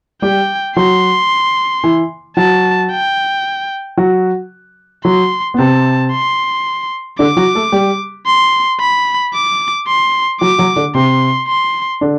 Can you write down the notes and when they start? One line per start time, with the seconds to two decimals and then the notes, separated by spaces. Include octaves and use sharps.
0.22 G3 G4 G5
0.76 F#3 F#4 C6
1.84 E3 E4
2.37 F#3 F#4 A5
2.91 G5
3.97 F#3 F#4
5.05 F#3 F#4 C6
5.54 B3
5.58 C3 C4 A5
6.12 C6
7.19 D3 D4 D6
7.37 F#3 F#4
7.55 A3 A4
7.72 G3 G4
8.27 C6
8.80 B5
9.34 D6
9.87 C6
10.41 F#3 F#4 D6
10.58 F#3 F#4
10.76 D3 D4
10.94 C3 C4 C6
11.48 C6
12.01 D3 D4